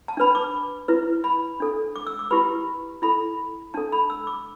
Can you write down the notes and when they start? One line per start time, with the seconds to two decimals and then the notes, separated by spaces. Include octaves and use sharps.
0.08 A5
0.17 D4 B4 B5
0.35 D6
0.88 E4 B4
1.24 B5
1.60 D4 A4
1.96 D6
2.07 E6
2.19 D6
2.31 E4 G4 B4 B5
3.02 E4 A4 B5
3.74 D4 A4 A5
3.92 B5
4.10 E6
4.27 D6